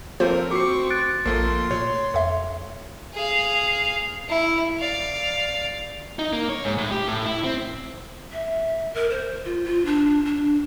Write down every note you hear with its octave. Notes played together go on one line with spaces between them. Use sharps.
F3 A3 A#3 C4 F4 A#4 C5
C4 F#4 C#6 D6 C7
F#6 A6 D7
A#1 F3 A3 A#3 C6
A#2 C#5
F2 E5
G#4 F5
E4
D5 F5
D#4
A#3
C#5
G#2
A2
G4
A2
E4
C4
E5
A#4
C5
F4
F4
D4
D4